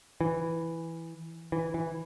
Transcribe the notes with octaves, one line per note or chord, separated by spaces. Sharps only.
E3
E3
E3